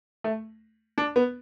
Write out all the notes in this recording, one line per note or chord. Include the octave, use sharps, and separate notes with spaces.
A3
D4
B3